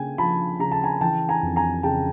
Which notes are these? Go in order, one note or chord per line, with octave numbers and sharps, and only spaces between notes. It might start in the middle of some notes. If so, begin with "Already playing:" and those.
Already playing: C#3 A#3 G5 G#5
F3 A5 B5
C#3 A#5
A5
G#5 A#5
E3 G5 A5
G#5 A#5
F2
G#5 A#5
C#3 G5 A5